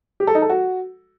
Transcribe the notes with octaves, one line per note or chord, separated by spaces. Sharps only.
G4
A4
D#4
A4
F#4